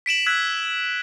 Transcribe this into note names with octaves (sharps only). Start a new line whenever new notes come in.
B6 D7 E7 F#7
E6 F#6 G#6 B6